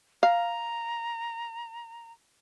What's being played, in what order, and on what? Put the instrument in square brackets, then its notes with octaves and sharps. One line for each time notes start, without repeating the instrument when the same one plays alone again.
[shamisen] F5 [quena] A#5